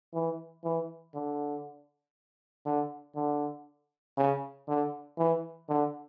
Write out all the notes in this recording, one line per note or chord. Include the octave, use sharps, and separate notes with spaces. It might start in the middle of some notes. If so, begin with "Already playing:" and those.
E3
E3
D3
D3
D3
C#3
D3
E3
D3